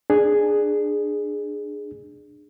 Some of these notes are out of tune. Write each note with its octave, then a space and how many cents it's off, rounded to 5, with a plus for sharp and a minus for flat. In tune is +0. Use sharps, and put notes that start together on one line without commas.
D4 +20 G#4 +0